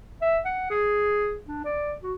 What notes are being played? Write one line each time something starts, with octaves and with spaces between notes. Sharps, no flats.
E5
F#5
G#4
D4
D5
F#4